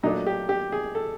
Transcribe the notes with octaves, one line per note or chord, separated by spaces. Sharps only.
A#2 F#3 A3 D4 D#4
G4
G4
G#4
A4